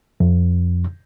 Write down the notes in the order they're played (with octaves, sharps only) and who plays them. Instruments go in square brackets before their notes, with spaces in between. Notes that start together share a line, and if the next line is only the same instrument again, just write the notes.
[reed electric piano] F2